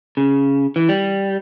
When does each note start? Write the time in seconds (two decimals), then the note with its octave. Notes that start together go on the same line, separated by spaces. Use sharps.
0.17 C#3
0.76 E3
0.89 G3